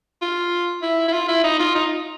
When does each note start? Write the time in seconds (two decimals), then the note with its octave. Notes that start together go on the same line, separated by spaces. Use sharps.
0.21 F4
0.82 E4
1.08 E4
1.13 F4
1.28 E4
1.43 D#4
1.59 F4
1.75 D#4